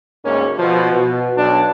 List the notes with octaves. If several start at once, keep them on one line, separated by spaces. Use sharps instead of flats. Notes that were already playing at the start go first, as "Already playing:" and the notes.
D2 G#2 A#3 C#4
B2 F3
B2
B1 D4